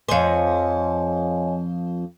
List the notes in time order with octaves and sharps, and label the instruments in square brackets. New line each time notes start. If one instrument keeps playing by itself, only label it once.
[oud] F2 C5 [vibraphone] C#5 D#5 G#5